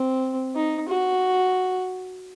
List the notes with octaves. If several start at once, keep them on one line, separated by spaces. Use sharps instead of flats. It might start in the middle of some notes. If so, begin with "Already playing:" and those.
Already playing: C4
D#4
F#4